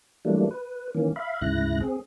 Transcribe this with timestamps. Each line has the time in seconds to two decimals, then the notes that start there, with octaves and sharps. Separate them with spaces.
0.25 E3 F#3 G3 A3 A#3 D4
0.51 B4
0.95 D#3 E3 A#3 C#4
1.16 E5 F5 B5
1.41 D2 G#2 C#3 E4 F#6 A#6
1.81 C4 G#4